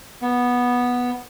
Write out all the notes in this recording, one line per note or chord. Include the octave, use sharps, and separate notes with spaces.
B3